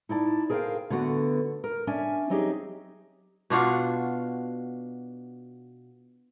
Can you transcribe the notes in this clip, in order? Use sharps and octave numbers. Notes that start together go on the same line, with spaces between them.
D#4 E4 D5 A5
G#4 A#4 C5 D#5 F5 G5
D3 A3 B3 F#4
A#4
C#4 D4 E5 G#5
F#3 C4 D#4 G4 G#4
B2 D4 F4 F#4